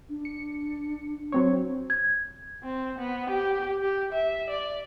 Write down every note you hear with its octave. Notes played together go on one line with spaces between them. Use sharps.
D4
C#7
F#3 C4 C#5
G#6
C4
B3
G4
G4
E5
D5